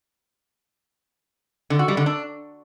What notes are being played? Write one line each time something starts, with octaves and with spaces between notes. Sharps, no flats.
D3
F#4
G3
D3
D4